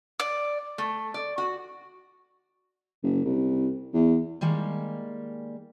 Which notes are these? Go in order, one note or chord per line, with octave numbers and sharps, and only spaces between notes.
D5
A3
D5
F#4
F#1
C2
E2
D#3 G3 G#3 A#3